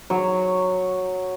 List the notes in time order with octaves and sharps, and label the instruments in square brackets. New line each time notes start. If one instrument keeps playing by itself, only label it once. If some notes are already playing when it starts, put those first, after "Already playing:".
[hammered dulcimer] F#3 C#5